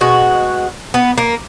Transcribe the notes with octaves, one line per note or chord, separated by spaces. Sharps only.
B2 G#3 F#4
B3
A#3